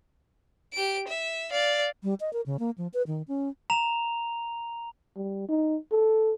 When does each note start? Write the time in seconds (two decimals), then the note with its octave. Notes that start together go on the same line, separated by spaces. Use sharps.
0.74 G4 D7
1.07 E5
1.51 D5 F5
2.03 G3
2.20 D#5
2.33 A#4
2.46 C#3
2.59 A#3
2.78 F3
2.94 B4
3.07 D#3
3.28 C#4
3.70 A#5 F7
5.16 G3
5.49 D#4
5.92 A4